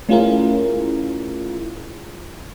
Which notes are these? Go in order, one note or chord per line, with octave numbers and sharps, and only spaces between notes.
A3 C#4 E4 F4 G#4 A#4